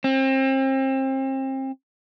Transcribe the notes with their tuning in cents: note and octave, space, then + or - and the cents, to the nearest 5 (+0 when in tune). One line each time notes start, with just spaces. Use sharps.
C4 +35